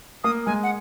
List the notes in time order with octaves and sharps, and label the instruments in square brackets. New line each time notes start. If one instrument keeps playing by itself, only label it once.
[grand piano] A#3 [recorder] D#6
[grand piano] G#3 [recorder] G#5
[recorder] F#5